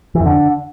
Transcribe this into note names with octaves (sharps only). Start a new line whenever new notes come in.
E3
F2
D3